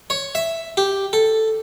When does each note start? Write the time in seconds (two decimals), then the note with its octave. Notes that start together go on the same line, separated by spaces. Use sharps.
0.10 C#5
0.35 E5
0.77 G4
1.13 A4